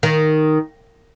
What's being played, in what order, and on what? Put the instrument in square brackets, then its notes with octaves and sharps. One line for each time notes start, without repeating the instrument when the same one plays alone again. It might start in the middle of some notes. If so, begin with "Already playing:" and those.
[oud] D#3